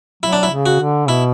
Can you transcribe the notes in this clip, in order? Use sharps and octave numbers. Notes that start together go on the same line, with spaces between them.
F#3 E4
D4
E4
C#3
F#4
D3
B2 E4